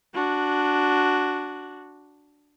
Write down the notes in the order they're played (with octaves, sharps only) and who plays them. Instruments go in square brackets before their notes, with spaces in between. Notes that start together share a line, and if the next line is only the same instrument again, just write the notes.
[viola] D4 F#4